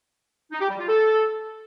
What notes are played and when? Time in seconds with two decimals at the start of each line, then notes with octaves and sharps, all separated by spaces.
0.52 D#4
0.61 G4
0.70 G3
0.79 F4
0.88 A4